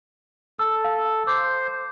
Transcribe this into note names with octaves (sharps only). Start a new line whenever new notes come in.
A4 E6
F5
C5 D6